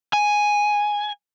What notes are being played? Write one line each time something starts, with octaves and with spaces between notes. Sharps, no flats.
G#5